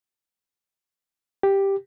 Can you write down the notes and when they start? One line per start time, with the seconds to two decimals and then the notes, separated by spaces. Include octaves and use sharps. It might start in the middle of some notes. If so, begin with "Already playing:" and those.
1.43 G4